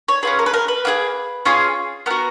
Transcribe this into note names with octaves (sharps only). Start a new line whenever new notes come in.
C#5
C#4 F4 G#4 B4
A#4
B4
A#4
B4
A#3 F4 G#4
C#4 F4 G#4
B3 F#4 A#4